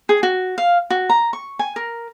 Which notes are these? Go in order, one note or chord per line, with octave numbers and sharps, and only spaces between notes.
G#4
F#4
F5
F#4
A#5
C#6
G#5
A#4